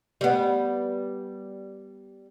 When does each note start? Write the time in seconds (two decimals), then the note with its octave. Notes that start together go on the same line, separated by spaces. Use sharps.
0.21 G3 B3